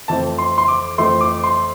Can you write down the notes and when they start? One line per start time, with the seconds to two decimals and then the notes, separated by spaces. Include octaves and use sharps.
0.08 F2 E3 A3 C4 A5
0.38 C6
0.58 C6
0.68 D6
0.98 F2 E3 A3 C4 C6
1.21 D6
1.44 C6